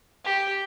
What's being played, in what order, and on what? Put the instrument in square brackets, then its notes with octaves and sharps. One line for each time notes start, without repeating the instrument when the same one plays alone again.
[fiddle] G4